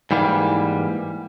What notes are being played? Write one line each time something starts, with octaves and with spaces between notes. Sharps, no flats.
G#2 E3 G3 A#3